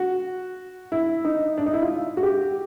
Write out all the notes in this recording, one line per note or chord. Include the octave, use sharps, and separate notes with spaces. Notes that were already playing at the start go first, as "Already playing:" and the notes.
Already playing: F#4
E4
D#4
D4
D#4
E4
F4
F#4
G4